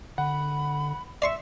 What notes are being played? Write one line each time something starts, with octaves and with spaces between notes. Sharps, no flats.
D3 F#5 B5
D5 E5 C6 C#6